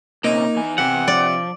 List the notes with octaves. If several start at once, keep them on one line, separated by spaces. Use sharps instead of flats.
C3 A#3 C#4 D#4
E2 E3 G#5
C3 F#5
F3 D5